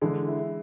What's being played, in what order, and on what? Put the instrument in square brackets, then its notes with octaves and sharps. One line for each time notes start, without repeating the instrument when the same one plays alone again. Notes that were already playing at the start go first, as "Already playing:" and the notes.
[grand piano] D3 [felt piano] E3 G#3
[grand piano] E4